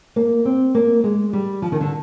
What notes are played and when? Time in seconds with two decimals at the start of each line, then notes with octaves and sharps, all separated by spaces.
0.16 A#3
0.45 C4
0.75 A#3
1.04 G#3
1.33 G3
1.62 F3
1.72 D#3
1.80 D3